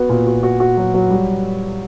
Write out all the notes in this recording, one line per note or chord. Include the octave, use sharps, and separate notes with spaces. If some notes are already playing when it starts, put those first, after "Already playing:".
Already playing: B3 F#4
A#2
F#4
F#4
F#4
F#3
F#3
G3